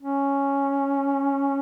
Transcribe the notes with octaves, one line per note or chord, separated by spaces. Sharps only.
C#4